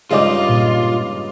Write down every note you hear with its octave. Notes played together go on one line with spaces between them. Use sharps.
G2 C#3 G#3 D#4 F4 D#5 D6
A#2 G3